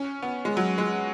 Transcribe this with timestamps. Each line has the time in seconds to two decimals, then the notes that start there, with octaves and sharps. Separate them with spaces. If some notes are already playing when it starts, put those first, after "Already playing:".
Already playing: C#4
0.22 B3
0.45 G#3
0.57 F#3
0.78 G#3